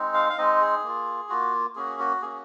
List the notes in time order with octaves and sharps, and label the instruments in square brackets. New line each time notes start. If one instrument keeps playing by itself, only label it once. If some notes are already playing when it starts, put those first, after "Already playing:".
Already playing: [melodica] G#3 C4 D#4
F5
F5
G#3 C4 D#4 D#5
G#4
A#3 F4
A#3 F4 F#4
A#3 C#4 F#4 G#4
F#4
A#3 C#4 F#4 G#4